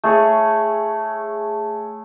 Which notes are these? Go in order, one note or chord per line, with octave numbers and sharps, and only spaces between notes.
A3 G#4 C#5